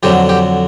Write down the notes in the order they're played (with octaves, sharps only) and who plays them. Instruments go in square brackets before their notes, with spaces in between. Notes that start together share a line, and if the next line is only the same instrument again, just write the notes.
[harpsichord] F2 D3 F#3 G4
G4